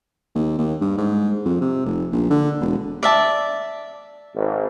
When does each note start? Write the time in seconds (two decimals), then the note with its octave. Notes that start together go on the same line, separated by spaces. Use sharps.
0.35 D#2
0.58 D#2
0.81 G2
0.97 G#2
1.45 F2
1.61 C3
1.85 F1
2.12 A#1
2.30 D3
2.61 E1
3.03 D5 E5 A5
4.35 G#1